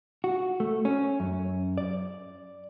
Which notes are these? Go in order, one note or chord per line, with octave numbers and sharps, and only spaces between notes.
F#4
A3
C#4
F#2
D5